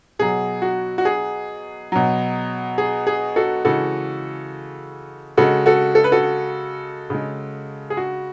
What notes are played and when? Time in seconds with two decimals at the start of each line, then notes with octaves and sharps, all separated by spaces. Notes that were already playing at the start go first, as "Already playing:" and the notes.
0.19 B2 F#3 G#4
0.62 F#4
0.98 F#4
1.05 G#4
1.92 B2 F#3
2.78 G#4
3.07 G#4
3.36 F#4 A4
3.65 C#3 E3 G#3 F#4 A4
5.37 C#3 G#3 F#4 A4
5.66 F#4 A4
5.95 A4
6.04 B4
6.12 F#4 A4
7.10 C#3 G#3
7.90 G#4
7.97 F#4